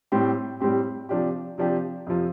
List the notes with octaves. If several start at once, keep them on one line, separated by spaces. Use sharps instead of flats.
A2 G3 C4 G4
A2 G3 C4 G4
C3 F3 D4 G4
C3 F3 D4 G4
F2 C3 F3